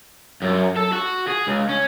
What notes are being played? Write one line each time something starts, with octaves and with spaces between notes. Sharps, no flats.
F#2
A4
F#4
G#4
C#2
C#4